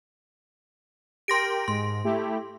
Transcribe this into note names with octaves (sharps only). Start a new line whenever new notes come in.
G4 A#4 G5 C6 A#6 D7
G#2 C6
A3 E4 G4